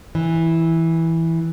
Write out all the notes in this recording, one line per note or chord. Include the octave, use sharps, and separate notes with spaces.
E3